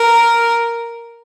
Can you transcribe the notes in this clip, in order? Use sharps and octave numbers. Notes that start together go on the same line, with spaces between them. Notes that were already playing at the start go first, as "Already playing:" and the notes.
Already playing: A#4